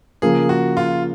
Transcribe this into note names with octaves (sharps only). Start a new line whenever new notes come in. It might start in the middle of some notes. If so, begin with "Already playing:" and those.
C#3 F3 A#3 G#4
F#4
F4